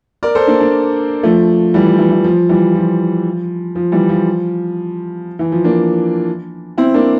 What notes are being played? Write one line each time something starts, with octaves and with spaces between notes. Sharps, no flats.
A#4 D5
A4 C5
A#3 D4
A#3 D4
F3 A3
E3 G3
F3
E3
E3
F3
E3 G3
F3
F3
E3 G3
F3
E3
F3
A#3 D4
C4 E4
A#3 D4